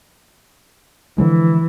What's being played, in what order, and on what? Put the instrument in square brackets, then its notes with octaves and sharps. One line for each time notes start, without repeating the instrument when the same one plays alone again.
[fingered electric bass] D3 F3 G#3 [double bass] E3